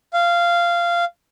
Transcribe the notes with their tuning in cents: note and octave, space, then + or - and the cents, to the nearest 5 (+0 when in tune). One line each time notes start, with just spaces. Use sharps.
F5 -15